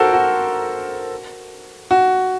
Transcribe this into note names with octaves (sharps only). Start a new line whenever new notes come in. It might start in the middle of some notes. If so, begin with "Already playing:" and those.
Already playing: F#4 A4 A#4 C5
F#4
F#4